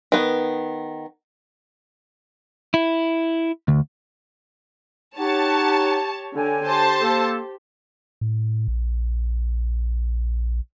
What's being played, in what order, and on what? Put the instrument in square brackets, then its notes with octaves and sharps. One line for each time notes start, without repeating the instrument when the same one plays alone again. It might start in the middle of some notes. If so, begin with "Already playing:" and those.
[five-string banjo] D#3 B3
[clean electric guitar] E4
D2
[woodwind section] D#4 F#5 [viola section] G4 C#5 [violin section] A5
[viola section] D3 [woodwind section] C#5 G5 G#5
[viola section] G4 [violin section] C5 A5
[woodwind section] A#3 A4
[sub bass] A2
A#1